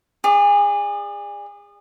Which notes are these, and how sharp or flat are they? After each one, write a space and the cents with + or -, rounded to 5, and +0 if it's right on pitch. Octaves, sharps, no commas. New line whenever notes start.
G#4 -30 D5 +10